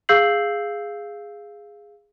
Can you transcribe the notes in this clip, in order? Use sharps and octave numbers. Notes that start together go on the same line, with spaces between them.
G#4 F5 E6 G6 C7 F#7